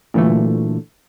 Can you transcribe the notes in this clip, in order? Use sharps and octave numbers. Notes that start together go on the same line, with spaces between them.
A#2 D3 E3 F#3 A3